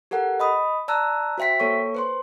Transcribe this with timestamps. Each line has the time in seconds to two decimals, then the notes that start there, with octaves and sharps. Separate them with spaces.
0.11 G4 A4 A#4 F#5
0.40 D#5 B5 D#6
0.88 D5 A5 A#5 E6 F#6
1.38 F#4 C5 E5 G5 B6
1.60 A#3 A4 C#5 C#6
1.95 B4 C5 C6